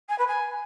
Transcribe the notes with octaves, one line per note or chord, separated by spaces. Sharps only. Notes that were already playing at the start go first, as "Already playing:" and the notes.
G#5
B4
G#5